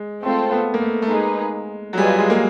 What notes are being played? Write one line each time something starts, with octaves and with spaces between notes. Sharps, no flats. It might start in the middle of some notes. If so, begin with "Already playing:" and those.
Already playing: G#3
A3 C4 F4 A4
B3
A#3
A3
A3
G#3 A#3 D#4 G#4 B4
F#3
G3 F4 G#4 B4 D#5 G#5
G#3
A#3